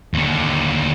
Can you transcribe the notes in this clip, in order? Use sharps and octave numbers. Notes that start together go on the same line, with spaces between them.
D#2 D3